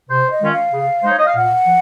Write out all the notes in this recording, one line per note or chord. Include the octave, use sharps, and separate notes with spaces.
C3 C5
D#5
D#3 G#3 C#4 F4
F5
C#3
G#3 D#4 C5
C#5
D#5
F5
A#2 F#5
F3